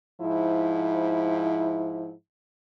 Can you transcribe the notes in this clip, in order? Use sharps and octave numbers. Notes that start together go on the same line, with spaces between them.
G#2 F3 E4